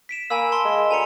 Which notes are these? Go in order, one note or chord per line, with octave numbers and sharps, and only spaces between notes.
B6 D7 E7
A#3 G#5 B5 E6
A5 C6 G7
G#3
D2 G#5 A#5 C#7